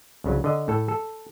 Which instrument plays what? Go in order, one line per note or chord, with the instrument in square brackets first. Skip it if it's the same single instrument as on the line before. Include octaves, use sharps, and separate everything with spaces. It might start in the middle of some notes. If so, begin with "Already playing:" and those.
[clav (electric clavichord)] C2 C#3 F#3
D3 D#5
A2 A4
A4